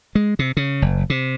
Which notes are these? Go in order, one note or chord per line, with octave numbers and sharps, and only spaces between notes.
G#3
C3
C#3
F#1
C3